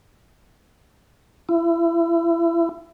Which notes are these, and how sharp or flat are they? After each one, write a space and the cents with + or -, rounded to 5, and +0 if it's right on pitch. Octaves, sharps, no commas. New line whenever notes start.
E4 +30